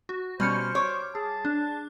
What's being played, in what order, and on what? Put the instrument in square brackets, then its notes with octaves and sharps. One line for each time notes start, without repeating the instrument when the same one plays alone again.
[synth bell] F#4
[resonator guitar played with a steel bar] B2 C#4 [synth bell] G3 F6 C#7 [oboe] C5
[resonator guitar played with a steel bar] C#5 [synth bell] D6
[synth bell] G#4 [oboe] A5
[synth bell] D4